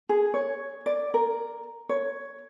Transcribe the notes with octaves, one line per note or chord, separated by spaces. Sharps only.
G#4
C#5
D5
A#4
C#5